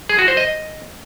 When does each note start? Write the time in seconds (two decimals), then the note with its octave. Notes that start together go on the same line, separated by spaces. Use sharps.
0.09 G#4
0.19 F#4
0.28 C5
0.37 D#5